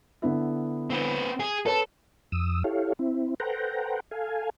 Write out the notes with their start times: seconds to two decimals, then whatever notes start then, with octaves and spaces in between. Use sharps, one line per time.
0.22 D3 B3 E4
0.90 C4 B4
1.40 G#4
1.66 A4 B4 C#5 A5
2.32 F2 D#6 E6
2.64 E4 G4 A4 C#5 F5
2.99 C4 E4
3.40 A4 B4 C5 F#5 G5 A#5
4.11 A4 F5 G#5